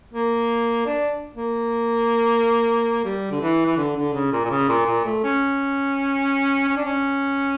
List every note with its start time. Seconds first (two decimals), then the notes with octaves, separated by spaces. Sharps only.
0.13 A#3
0.86 D4
1.35 A#3
3.05 G3
3.32 D3
3.41 E3
3.66 E3
3.77 D3
3.96 D3
4.14 C#3
4.32 A#2
4.45 A#2
4.51 C#3
4.69 A#2
4.86 A#2
5.05 A3
5.24 C#4
6.69 C#4
6.77 D4
6.86 C#4